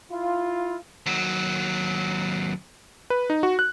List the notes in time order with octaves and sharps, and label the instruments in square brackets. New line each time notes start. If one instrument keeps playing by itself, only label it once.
[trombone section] E4 F4
[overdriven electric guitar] D#2 F#3
[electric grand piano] B4
D#4
F#4
F#6